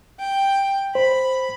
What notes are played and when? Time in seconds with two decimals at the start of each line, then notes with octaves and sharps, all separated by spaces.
0.20 G5
0.95 C5 B5